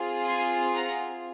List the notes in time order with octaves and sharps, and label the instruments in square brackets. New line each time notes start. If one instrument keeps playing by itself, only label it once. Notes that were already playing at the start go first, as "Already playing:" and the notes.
Already playing: [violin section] C4 F4 G#4
G#5 C6
F#5 A#5